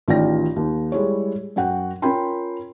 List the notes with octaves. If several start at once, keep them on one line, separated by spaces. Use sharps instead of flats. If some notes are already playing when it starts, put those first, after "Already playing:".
A1 D#3 F4 D5 G5 A#6
D#2
G3 G#3 E4 C#5
F#2 F#4 F#5 G5
C#4 F4 A#4 G5 B5 C6